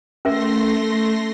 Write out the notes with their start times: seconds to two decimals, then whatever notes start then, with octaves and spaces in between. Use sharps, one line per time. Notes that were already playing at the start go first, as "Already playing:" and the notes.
0.25 A3 C#4 A#4 E5 C6 A#6